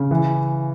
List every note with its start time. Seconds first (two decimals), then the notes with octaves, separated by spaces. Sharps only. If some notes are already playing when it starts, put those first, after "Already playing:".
Already playing: C#3
0.11 E3